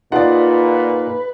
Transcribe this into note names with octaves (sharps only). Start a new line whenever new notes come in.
A#2 D#4 F4 G#4 B4 D5 F#5